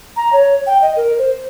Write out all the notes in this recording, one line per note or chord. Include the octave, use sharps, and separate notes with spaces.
A#5
C#5
G5
D#5
A#4
C5